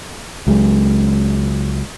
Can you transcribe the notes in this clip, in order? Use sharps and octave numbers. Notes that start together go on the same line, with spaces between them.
C#2 F#3 G#3